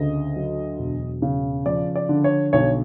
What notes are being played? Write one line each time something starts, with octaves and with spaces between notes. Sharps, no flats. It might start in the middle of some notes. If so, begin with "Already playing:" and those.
Already playing: D2 C#3 D#5
F#3
E1
C#3
F3 D5
D5
D3
C#5
B1 C#5